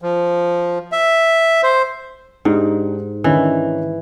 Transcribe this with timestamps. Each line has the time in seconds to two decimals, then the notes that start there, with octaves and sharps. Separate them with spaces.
0.02 F3
0.92 E5
1.63 C5
2.45 G#2 D4 D#4 G4
3.24 D#3 E3 C#4 D4